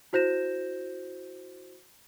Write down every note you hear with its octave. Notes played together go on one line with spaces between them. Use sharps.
E4 F#4 C5 G6 A#6 E7